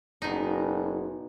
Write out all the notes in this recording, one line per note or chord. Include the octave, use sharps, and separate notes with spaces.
F#1 B2 D#4